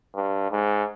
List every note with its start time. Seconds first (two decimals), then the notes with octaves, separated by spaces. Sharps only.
0.15 G2
0.51 G#2